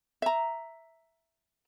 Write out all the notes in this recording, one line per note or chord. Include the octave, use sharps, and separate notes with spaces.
E5 A#5